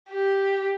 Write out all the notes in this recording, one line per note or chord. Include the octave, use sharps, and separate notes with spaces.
G4